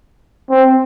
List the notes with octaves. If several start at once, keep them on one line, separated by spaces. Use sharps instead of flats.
C4